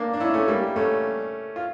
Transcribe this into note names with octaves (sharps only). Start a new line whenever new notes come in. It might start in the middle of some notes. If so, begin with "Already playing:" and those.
Already playing: A#3 D4
D4
C#4 E4
A3 C#4
G3 A#3
A3 C#4
F4